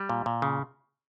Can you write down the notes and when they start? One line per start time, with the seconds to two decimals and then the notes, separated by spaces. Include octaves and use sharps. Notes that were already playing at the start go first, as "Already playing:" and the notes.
Already playing: G3
0.09 A#2
0.26 A#2
0.42 C#3